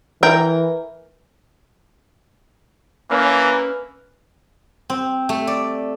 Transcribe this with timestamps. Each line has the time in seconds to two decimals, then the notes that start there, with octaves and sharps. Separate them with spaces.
0.23 E3 A#4 G5
3.11 E3 A#3 C#4 B4
4.90 C4
5.29 A3
5.47 D5